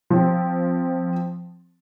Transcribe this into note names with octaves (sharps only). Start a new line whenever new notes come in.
F3 C4